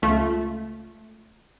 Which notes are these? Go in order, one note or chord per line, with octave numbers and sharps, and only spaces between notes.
C#2 A3 F4